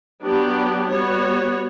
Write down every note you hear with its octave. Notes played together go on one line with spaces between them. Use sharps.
F#3 B3 D4 G4
G3 B3 F#4 C#5